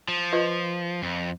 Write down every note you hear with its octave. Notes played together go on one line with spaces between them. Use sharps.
F3
F4 B4 D#5
F2